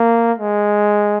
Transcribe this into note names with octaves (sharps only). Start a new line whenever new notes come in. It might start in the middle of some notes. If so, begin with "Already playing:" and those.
Already playing: A#3
G#3